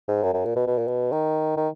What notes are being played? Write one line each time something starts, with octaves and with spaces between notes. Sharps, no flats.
G#2
F#2
F#2
A#2
B2
B2
A#2
B2
D#3
D#3